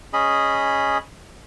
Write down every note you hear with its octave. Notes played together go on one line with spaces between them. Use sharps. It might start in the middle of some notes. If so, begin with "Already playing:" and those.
C#4 G#4 D#5 B5